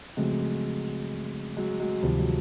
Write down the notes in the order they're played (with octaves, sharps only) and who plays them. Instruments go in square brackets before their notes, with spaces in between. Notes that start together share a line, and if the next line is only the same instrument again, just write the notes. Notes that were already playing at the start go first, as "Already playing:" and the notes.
[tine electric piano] C#3 F3 A3 C4 [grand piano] F#3 G#3
[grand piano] F#3 G#3
F#3 G#3
[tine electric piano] D2 C3 D#3 [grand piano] F3 G3
[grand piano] F#3 G#3